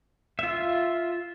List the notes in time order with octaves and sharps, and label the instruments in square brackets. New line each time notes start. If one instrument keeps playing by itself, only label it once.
[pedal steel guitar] F4 E5